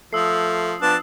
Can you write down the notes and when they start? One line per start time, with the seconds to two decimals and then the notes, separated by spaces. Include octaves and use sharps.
0.13 F3 A3 D#6 E6 C7
0.82 F3 B3 D4 A5